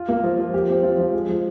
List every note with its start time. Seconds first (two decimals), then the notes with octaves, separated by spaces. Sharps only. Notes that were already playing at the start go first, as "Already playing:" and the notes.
Already playing: F4
0.08 A#3
0.24 F3
0.39 F3
0.54 G4
0.69 C4
0.83 F3
0.98 F3
1.14 G#3
1.29 F3